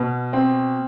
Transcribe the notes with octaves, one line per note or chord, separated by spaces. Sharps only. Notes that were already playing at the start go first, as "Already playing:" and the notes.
Already playing: B2
C4